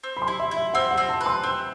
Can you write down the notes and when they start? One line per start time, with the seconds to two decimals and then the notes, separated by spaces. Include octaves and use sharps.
0.03 C4
0.17 B5
0.22 C6
0.28 E4
0.39 E5
0.51 E4
0.57 E5
0.74 C4 F#5
0.91 F#5
0.98 C4
1.09 A5
1.21 B4
1.26 C6
1.43 C4 E6